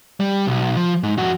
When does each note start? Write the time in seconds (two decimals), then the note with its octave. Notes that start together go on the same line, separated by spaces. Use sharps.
0.20 G3
0.47 B1
0.76 F3
1.03 G#2
1.18 F2 F#4